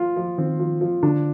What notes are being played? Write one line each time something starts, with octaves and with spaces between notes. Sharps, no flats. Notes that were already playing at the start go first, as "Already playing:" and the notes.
Already playing: F3 F4
F3
D#3 C4
F3
F3
D3 D4